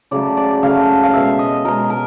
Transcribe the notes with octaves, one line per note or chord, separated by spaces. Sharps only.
C#3 F#3 A3 D5
D5
C#3 F#3 A3 F5
F5
B2 G#3 E5
D#5
B2 G#3 A#4
A#4